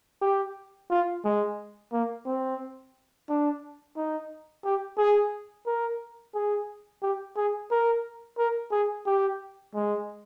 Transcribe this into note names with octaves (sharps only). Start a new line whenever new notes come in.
G4
F4
G#3
A#3
C4
D4
D#4
G4
G#4
A#4
G#4
G4
G#4
A#4
A#4
G#4
G4
G#3